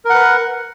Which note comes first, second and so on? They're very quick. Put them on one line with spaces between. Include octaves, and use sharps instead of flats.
A#4 F#5 B4